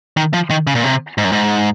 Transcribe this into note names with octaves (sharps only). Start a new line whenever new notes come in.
D#3
F3
D#3
C#3
A#2
C3
G#2
F#2
G#2